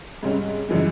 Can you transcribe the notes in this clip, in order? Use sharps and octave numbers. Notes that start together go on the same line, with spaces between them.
G#2 C3 G3 C#4
F#2 C#3 E3 G3 G#3